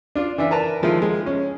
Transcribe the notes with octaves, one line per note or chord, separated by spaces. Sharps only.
D4 F4
E3 D4 E5
A#4 B4 A5 A#5
D#3 F3 G#3 E4 F4
G#3
C#4